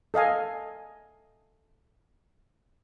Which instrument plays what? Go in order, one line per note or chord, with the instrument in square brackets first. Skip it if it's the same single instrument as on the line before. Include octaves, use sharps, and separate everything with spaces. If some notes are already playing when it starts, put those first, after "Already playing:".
[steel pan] A4 D#5 F5 G#5